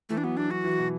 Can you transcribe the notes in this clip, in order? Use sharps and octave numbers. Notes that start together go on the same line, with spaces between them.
E3 A3
D4
F#3 B3
F#3 D4
F#3 F#4
E3
B2